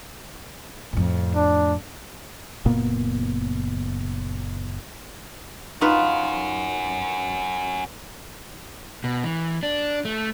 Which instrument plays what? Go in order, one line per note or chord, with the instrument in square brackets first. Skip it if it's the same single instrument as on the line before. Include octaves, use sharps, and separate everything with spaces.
[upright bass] F2 A2
[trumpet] D4
[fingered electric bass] F#1 A#2 A#3 B3
[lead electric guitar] C#4 F#4 [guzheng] D#4 F4 B4
[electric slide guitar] B2
E3
D4
A3